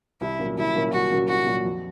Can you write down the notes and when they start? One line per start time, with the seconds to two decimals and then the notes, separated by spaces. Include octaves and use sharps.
0.21 C2 E4
0.39 A#2 F#3 A#3 C#4
0.57 C2 E4
0.75 A#2 F#3 A#3 C#4
0.93 C2 F#4
1.11 A#2 F#3 A#3 C#4
1.28 C2 F#4
1.46 A#2 F#3 A#3 C#4
1.64 F2